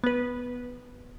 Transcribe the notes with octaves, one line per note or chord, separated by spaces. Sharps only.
B3 B4